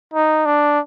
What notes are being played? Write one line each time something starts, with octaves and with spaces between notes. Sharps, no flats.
D#4
D4